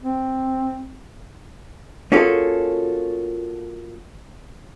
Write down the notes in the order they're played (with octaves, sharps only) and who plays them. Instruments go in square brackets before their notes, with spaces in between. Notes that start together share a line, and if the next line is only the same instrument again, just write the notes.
[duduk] C4
[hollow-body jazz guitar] A#3 C#4 F4 F#4 G#4 A4